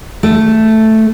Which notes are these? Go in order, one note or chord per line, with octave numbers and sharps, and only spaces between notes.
A3